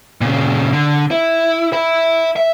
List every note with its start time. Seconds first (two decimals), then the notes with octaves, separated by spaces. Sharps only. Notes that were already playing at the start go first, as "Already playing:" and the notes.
0.21 A#2 C#3
0.73 D3
1.11 E4
1.73 E5 B5
2.36 E5